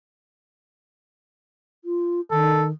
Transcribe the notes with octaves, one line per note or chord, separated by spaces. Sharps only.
F4
D#3 A4